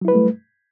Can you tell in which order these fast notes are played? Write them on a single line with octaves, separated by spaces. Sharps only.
F#3 E4 B4 G3 A3